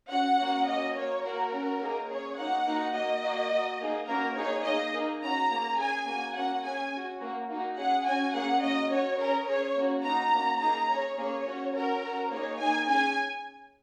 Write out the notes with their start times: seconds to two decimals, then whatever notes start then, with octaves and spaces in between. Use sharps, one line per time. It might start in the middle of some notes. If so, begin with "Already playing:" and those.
0.11 C#4 F#4 F#5
0.40 A#3 C#4 F#4
0.67 A#3 C#4 F#4 D#5
0.96 A#3 F#4 C#5
1.24 A#3 F#4 A#4
1.53 C#4 F#4
1.81 A#3 D#4 G#4
2.09 C#4 G#4 C#5
2.38 A#3 D#4 F#4 F#5
2.66 A#3 D#4 F#4
2.94 A#3 F#4 D#5
3.23 A#3 F#4
3.51 A#3 F#4
3.80 A#3 D#4 G#4
4.08 A#3 C#4 F#4 A#4
4.36 A#3 D#4 G#4 C#5
4.64 A#3 D#4 G#4 D#5
4.93 A#3 D#4 G#4
5.21 C#4 F#4 A#5
5.50 A#3 C#4 G#4
5.78 C#4 G#4 G#5
6.06 A#3 F#4 G#5
6.35 A#3 C#4 F#4 F#5
6.63 C#4 G#4 G#5
6.92 C#4 F#4
7.20 A#3 F#4
7.49 A#3 D#4 F#4
7.77 C#4 G#4 F#5
8.05 C#4 F#4 G#5
8.33 A#3 C#4 G#4 F#5
8.62 A#3 C#4 F#4 D#5
8.90 C#4 F#4 C#5
9.19 C#4 G#4 A#4
9.47 C#4 G#4 C#5
9.76 A#3 C#4 F#4
10.04 A#3 D#4 F#4 A#5
10.33 A#3 C#4 F#4
10.60 A#3 D#4 G#4 A#5
10.89 C#4 G#4 C#5
11.17 A#3 C#4 G#4 C#5
11.46 C#4 F#4
11.74 C#4 F#4 A#4
12.02 C#4 F#4
12.31 A#3 D#4 G#4 C#5
12.59 A#3 D#4 G#4 G#5
12.88 C#4 G#4 G#5